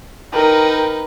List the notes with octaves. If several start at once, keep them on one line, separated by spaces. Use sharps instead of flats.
D#4 A#4 B4 G5